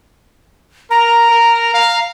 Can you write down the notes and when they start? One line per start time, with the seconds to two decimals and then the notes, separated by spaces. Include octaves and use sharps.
0.91 A#4 A#5
1.30 A#4
1.74 F5